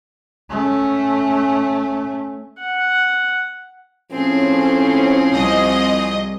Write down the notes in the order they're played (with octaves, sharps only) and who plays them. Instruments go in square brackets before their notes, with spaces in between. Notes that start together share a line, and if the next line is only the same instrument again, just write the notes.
[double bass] A3 C#4
[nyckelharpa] F#5
[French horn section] A2 C#4 [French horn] F3 [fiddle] C4 G#4
[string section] C2 D#5